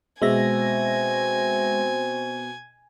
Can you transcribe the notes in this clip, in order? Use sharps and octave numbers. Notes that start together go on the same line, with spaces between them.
B2 G#3 C4 E5 G#5 A#6